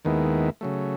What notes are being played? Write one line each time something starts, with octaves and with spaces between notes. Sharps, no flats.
D#2 D#3 G#3 B3 E4
C#3 F#3 A3